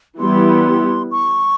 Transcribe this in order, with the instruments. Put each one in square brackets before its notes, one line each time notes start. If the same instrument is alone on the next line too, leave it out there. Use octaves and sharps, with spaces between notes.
[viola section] E3 G3 B3 E4 G4 [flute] C6
[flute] C#6